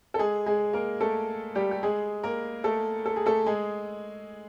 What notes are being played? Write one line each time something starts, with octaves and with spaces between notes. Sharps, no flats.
A4
G#3 G#4
G#3 G#4
A#3 A#4
A3 A4
G3 G4
G4
G#3 G#4
A#3 A#4
A3 A4
A4
G#4
A3 A4
G#3 G#4